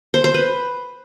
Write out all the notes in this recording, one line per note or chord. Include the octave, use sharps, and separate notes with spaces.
C5
C5
B4